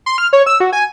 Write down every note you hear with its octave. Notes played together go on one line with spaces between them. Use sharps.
C6
F6
C#5
E6
F#4
G#5